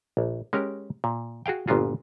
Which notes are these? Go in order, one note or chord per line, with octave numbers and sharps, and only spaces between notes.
A#1
G#3 C#4 G4 A#4
A#2
F#4 G#4 F5 G5
G1 A#2 B3 F4 F#4